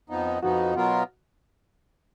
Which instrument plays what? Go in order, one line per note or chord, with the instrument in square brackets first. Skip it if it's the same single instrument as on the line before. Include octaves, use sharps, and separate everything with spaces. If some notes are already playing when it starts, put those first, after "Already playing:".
[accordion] F2 F3 B3 D#4
[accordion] F2 F3 B3 D#4 [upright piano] F#4
[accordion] B2 F#3 B3 F4 A#4